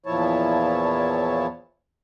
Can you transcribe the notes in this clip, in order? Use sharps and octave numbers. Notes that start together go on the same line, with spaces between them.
E2 A#2 F3 E4 C#5 A5